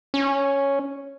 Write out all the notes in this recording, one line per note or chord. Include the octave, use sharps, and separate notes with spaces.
C#4